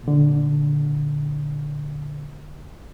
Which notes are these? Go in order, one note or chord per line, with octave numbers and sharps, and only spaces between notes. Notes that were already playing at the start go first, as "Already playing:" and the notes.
A#2 D3